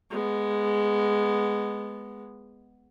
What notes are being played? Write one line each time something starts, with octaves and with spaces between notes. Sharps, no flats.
G#3 B3